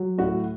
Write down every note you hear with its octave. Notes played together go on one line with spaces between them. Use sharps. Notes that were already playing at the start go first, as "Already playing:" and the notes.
Already playing: F#3
A2 F#4